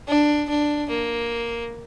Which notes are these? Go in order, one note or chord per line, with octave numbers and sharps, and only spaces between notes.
D4
D4
A#3